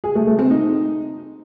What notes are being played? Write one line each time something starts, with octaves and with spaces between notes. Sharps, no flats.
G#4
A3
A3
C4
D#4